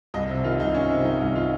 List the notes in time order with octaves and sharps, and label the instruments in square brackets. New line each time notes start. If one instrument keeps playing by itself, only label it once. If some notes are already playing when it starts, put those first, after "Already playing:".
[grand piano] C2 D#5
C3
D#3 F4
C2 D#4
C2 C#4
C3
D#3 D#4
C2
F4